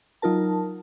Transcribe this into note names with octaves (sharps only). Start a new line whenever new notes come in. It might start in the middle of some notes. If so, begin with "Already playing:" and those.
F#3 D#4 F4 A#4 A5